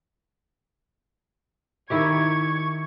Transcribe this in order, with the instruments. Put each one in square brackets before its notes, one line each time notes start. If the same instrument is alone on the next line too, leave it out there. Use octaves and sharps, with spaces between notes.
[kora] D#3 E4 G4 [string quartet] C#6 G#6